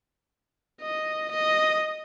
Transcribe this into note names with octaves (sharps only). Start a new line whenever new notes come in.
D#5
D#5